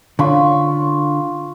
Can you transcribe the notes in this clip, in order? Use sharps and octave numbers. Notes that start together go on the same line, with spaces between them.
D3 F4 B5 C#6